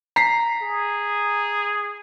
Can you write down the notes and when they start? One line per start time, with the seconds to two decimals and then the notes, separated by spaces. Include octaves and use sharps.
0.16 A#5 B6 C7
0.62 G#4